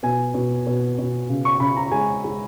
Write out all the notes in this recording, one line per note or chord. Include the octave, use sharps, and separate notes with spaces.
B2 G#5
B2
B2
B2
C#3
C#6
C#3 B5
A#5
G#3 G#5
G#3